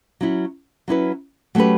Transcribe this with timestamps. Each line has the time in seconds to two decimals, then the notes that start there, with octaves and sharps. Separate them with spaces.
0.21 F#3 C#4 E4
0.88 F#3 C#4 E4 B4
1.55 F#3 A3 C#4 G4 B4